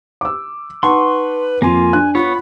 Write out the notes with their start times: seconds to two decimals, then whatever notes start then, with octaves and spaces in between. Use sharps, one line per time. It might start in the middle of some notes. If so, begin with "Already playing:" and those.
0.21 D6 E6
0.83 D#4 B4 F#5 A5 C6 C#6
1.62 F2 A#3 F4 G#5
1.93 D4 F#6
2.15 B3 F4 C#5 B5